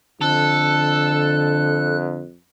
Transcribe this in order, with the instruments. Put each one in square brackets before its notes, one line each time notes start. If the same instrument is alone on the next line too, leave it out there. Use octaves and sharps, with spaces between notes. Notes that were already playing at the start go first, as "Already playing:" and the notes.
[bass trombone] F2 [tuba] D3 [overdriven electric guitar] A4 [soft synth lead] F#6